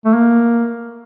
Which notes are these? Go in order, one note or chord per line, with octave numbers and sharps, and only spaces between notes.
A3
A#3